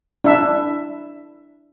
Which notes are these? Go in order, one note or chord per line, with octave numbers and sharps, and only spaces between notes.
D4 E4 E5